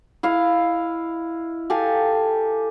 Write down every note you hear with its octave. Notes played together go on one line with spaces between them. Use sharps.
E4 D#5 F5
G4 A4 F5 G#5